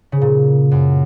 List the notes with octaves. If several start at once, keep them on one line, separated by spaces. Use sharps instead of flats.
C#3
A#2
F#2